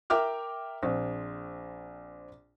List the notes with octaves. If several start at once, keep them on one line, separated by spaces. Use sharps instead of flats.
A#4 E5 G5 D6 F6
A#1 C4